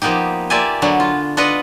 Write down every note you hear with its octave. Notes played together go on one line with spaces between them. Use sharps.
F3 A#3 B3 D#4 G4
A#3 F4 G4 D5 E5 G#5
D3 F#3 B3 D4
F4
D4 F4 B4 D#5 F#5